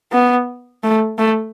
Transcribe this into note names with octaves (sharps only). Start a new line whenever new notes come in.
B3
A3
A3